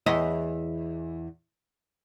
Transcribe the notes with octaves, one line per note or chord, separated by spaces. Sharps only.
E2 D#5 E5